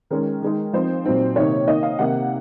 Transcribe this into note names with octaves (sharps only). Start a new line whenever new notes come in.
D#3 G#3 C#4 A#4
D#3 G#3 D#4
F3 C4 D#4 C5
A#2 F#3 C4 D#4
C3 D#3 A#3 D#4 C#5
D#3 A#3 D#4 D#5
F5
C3 D#3 A#3 D#4 F#5